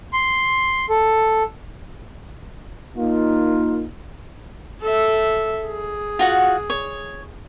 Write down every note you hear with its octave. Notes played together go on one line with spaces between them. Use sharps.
C6
A4
A#3 D#4 F4
A4 E5
G#4
F4 F#4 F#5
C#5